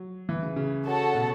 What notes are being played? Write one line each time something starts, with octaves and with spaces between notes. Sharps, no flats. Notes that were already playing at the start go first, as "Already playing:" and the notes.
Already playing: F#3
E3
C#3
C#3
F#4 A4 C#5 F#5 A5
B2